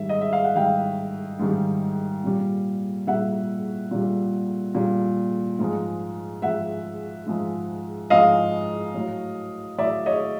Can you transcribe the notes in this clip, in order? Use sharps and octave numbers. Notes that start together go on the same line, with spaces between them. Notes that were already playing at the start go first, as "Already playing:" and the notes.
Already playing: G#2 D#3 G3 E5
D#5
E5
F5
F#5
G#2 D#3 G3 F5 G5
G#2 D#3 G3
A#2 G3
A#2 G3 E5 F#5
A#2 G3
A#2 G3
G#2 F3 G#3
G#2 F3 G#3 E5 F#5
G#2 F3 G#3
G#2 F3 G#3 D#5 F5
A2 F#3
A2 F#3 D5 E5
C#5 D#5